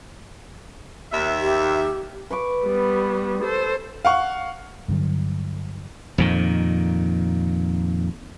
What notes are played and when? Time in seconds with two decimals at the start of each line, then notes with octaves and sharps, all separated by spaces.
1.12 D#2 E5
1.41 G4
2.30 B4 C#6 D6
2.64 G3 B3
3.42 A4 C5
4.05 F5 F#5 C#6
4.88 G2 D3 F#3
6.18 F2 A#2 D#3